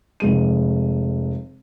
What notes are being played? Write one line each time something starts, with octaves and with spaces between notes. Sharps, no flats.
F1 G#3 D#7